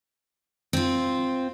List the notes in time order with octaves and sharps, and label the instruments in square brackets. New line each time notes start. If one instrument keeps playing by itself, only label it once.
[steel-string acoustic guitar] C4 F4